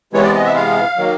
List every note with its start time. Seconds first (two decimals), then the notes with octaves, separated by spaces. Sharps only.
0.13 C3 E3 G#3 B3 C#5
0.24 D5
0.35 D#5
0.45 E5
0.56 F5
0.97 D#3 F#3 A#3